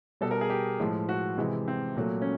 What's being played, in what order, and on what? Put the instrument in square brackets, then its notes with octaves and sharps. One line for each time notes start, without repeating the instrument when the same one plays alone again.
[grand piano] B2 G3 A4
A#4
G#4
G4
A2 F3 G#3
F#4
C3 E3 G#3
C4
A#2 F#3 A3
C#4